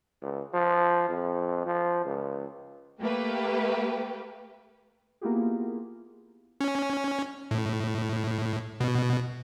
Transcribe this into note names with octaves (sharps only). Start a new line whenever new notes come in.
C#2
F3
F2
F3
C#2
A3 A#3 G4 B4
A#3 B3 E4 F4 G4 G#4
C#4
A2
B2